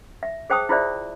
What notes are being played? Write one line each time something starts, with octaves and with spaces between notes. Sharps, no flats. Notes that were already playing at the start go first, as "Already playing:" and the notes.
E5
G#4 C5 G5 A5 D#6
E4 F4 G#4 C5 D5 E5